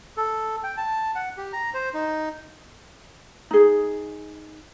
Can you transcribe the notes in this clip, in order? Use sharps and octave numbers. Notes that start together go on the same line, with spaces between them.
A4
G5
A5
F#5
G4
A#5
C5
D#4
D#4 G#4